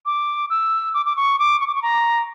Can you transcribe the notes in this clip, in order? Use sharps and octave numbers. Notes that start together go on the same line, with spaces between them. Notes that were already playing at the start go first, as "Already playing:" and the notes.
D6
E6
D6
D6
C#6
D6
C#6
D6
C#6
A#5